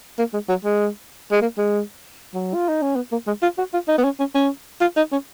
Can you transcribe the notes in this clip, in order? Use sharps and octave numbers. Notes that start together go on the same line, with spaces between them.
A#3
G#3
F#3
G#3
G#3
A#3
G#3
F#3
F4
D#4
C#4
B3
A#3
G#3
F4
F#4
F4
D#4
B3
C#4
C#4
C#4
F4
D#4
C#4